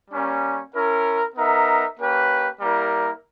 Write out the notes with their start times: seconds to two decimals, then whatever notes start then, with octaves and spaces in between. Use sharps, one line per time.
0.11 G3 A#3 C#4
0.74 C#4 E4 A#4
1.36 B3 D#4 A#4 E5
1.99 A#3 C#4 G4 B4
2.61 G3 A#3 E4 A#4